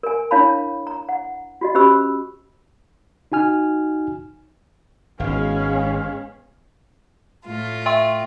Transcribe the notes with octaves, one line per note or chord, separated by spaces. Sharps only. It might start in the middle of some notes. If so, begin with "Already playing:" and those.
A#4 G#5
D4 E4 C#5 F5 A5 B5
A#5
F#5
F4 F#4 D#5
C#4 G4 C5 B5 E6
D#4 F#4 G#5 F6
G#1 G#3 B3 C#4 G#4 F5
A2 F4
E5 G5 C6